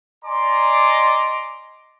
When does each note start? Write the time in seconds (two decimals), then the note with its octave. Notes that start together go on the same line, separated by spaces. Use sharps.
0.24 D5 D#5 G#5 A#5 C6 D6